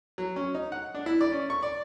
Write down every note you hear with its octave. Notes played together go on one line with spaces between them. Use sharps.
F#3
C#4
D#4
F#5
D4
E4
D5
C#4
C#6
D5